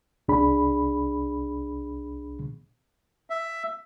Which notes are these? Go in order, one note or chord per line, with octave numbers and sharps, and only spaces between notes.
C2 D4 G#4 B5
E5